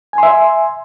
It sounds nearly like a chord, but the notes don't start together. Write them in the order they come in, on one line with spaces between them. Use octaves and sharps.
G#5 C6 E5